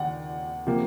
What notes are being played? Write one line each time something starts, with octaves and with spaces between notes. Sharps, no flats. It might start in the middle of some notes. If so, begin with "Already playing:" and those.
Already playing: D#2 F#5
C3 F3 A#3